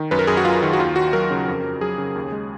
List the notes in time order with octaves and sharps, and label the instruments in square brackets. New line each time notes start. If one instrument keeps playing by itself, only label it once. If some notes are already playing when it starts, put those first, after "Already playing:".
Already playing: [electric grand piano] D#3
F#2 B4
A#4
F#2 G#4
F#4
F#3 F4
D#3
F#4
D#2 F4
D#2 F#4
F#3 A#4
C#3
F2
F2
F#3 G#4
C#3
D#2
G#3